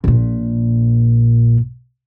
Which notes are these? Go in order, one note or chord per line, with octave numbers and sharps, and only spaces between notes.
A#1 A#2